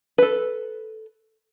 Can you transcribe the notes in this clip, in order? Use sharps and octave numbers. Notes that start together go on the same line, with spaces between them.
A4 B4